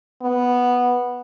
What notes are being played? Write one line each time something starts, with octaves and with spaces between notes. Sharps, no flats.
B3